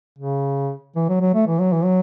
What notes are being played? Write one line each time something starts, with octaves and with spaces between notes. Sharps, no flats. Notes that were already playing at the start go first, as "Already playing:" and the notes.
C#3
E3
F#3
F#3
A3
E3
F#3
E3
F#3